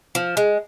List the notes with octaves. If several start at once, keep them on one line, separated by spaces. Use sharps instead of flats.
F3
G#3